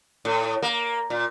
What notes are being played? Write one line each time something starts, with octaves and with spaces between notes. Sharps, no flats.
A2
A#3
A#2